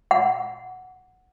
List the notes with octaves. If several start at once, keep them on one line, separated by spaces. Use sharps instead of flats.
F#5